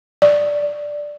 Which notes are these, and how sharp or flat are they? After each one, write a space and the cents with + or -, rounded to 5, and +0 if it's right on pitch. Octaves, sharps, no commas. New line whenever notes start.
D5 +0